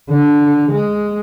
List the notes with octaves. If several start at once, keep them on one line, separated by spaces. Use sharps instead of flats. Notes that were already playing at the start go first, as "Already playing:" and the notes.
D3
G#3